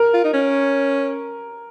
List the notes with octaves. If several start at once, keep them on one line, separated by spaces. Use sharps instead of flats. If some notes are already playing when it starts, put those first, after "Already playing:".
Already playing: A#4
F4
D#4
C#4